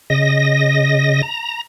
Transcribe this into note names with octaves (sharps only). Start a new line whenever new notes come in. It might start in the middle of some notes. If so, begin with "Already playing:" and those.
C#3 D#5 A#6
A#5